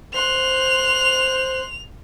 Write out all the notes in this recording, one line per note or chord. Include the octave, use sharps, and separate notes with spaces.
C5 C6 F#6 F7